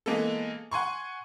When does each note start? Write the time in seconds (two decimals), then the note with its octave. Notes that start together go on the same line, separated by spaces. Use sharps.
0.06 E3 G#3 A#3 B3 A4
0.71 F#5 G#5 C6 C#6